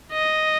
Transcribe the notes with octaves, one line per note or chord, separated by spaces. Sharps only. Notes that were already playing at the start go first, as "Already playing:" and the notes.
D#5